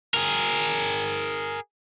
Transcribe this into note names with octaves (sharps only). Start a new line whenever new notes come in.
G#4 A#4